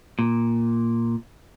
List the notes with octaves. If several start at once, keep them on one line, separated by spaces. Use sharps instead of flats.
A#2